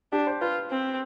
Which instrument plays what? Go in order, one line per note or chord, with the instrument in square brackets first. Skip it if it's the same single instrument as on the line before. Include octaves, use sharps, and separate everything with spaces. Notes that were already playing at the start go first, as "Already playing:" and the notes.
[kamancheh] D4 [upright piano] G4
[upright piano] C5
[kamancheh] F4 [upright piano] B4
[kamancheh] C4